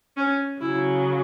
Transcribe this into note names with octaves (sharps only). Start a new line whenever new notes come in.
C#4
C#3 F#3 E4